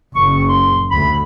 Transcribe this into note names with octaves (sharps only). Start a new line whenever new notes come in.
F#1 C#6
C6
D2 B5